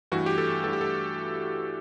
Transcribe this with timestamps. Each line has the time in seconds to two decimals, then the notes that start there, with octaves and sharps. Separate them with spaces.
0.12 G2 E3 A3 F#4
0.26 G4
0.38 A4
0.64 G2 E3 A3 A4
0.73 G4
0.81 A4